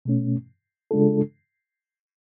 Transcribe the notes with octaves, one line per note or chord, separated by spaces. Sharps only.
B2 A3 C#4
C#3 G#3 D4 F4 A4